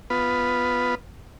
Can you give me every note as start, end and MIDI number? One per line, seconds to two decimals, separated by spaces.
0.10 0.95 59
0.10 0.95 65
0.10 0.95 71